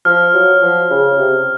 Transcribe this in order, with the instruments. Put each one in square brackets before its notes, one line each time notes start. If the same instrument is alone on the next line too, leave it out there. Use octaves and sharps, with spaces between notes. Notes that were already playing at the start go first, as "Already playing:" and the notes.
[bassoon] F3 [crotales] F6
[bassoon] F#3
F3
C#3
C3